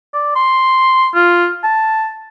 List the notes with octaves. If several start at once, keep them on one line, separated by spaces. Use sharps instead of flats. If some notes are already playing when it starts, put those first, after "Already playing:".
D5
C6
F4
A5